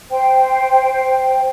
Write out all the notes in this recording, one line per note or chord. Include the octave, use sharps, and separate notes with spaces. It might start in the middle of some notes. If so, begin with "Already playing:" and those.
C5 G5